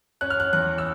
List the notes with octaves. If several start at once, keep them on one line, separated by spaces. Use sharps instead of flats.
C#4 F#6
F6
F#6
E2 F#6
E6